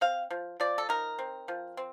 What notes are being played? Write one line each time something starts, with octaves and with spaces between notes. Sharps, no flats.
C4 F5
F3
F3 D5
A4
D#4 A#4
C4
F3
C4